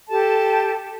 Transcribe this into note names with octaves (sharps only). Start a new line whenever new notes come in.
G4 A4 A5